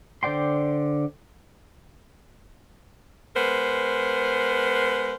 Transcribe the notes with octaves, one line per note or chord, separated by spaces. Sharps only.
D3 C5 D5 G5 C6
G#3 B3 A#4 C5